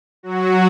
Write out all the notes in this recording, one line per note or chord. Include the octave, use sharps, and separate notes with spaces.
F#3 F#4